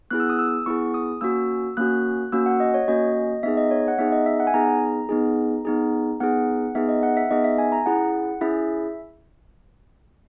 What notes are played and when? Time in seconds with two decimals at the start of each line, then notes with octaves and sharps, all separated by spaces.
0.11 B3 E4 G#4 F#6
0.20 E6
0.29 D#6
0.39 E6
0.66 B3 E4 G#4 C#6
0.94 D#6
1.21 A#3 C#4 F#4 E6
1.77 A#3 C#4 F#4 F#6
2.32 A#3 C#4 F#4 E6
2.46 F#5
2.60 D#5
2.74 C#5
2.88 A#3 C#4 F#4 D#5
3.43 B3 D#4 G#4 E5
3.57 D#5
3.71 C#5
3.88 F#5
3.98 B3 D#4 G#4 E5
4.12 D#5
4.26 E5
4.40 F#5
4.47 G#5
4.54 B3 D#4 G#4 A#5
5.09 B3 D#4 G#4
5.65 B3 D#4 G#4
6.20 B3 D#4 G#4 F#5
6.75 B3 D#4 G#4 E5
6.89 D#5
7.03 F#5
7.17 E5
7.30 B3 D#4 G#4 D#5
7.44 E5
7.58 G#5
7.72 A#5
7.86 C#4 E4 G#4 F#5
8.41 C#4 E4 G#4 E5